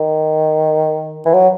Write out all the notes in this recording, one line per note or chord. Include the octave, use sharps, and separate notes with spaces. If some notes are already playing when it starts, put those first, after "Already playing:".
Already playing: D#3
E3
F#3